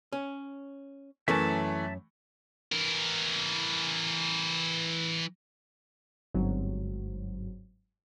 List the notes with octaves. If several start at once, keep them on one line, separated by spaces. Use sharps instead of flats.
C#4
F#2 E3 A3 C#4 A#4 E5 A5
E3 A#4
G1 G#2 F#3 C4